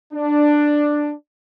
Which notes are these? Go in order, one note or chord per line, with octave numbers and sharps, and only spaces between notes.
D4